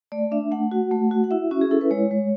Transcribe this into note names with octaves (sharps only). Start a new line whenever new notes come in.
A3 D5
D4 E5
A3 F#5
F#4
A3
F#4
F#5
E4 E5
C#4 F#4
G#4
E4 A4
B4
G#3 C#5
G#3